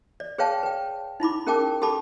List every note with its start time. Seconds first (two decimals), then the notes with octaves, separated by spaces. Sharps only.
0.20 D5
0.38 G#4 B4 C#5 F5 G5 A5
0.63 B4 G5
1.20 D#4 E4 B5 D6
1.47 C#4 G#4 A#4 G5 A5 D6
1.82 G4 A4 A5 B5 D6